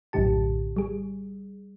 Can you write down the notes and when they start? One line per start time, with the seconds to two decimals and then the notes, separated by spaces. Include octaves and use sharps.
0.13 A#1 F#2 A2 D3 G4 A5
0.76 G3 G#4